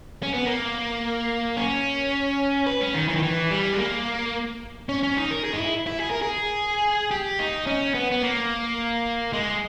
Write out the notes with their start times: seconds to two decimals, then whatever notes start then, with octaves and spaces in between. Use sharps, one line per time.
0.23 C#4
0.34 B3
0.46 A#3
1.57 C#4
2.67 B4
2.81 C#4
2.94 D#3
3.09 E3
3.16 D#3
3.23 E3
3.51 G3
3.73 G#3
3.78 A#3
4.89 C#4
5.03 C#4
5.17 D#4
5.31 A#4
5.44 G#4
5.53 D#4
5.59 E4
5.87 E4
6.01 G#4
6.11 A#4
6.22 G#4
7.11 G4
7.39 D#4
7.67 C#4
7.94 B3
8.11 B3
8.22 A#3
9.33 G#3